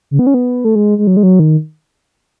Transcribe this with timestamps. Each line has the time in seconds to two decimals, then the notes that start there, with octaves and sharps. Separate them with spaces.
0.11 C#3
0.19 B3
0.27 C#4
0.34 B3
0.65 A3
0.75 G#3
0.98 G#3
1.07 F#3
1.17 G#3
1.23 F#3
1.39 D#3